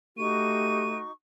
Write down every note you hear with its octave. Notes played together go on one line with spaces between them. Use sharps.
A3 D#4 F#4 G4 C#6 D#7